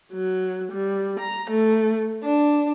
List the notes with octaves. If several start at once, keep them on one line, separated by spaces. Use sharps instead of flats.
F#3
G3
A#5
A3
D4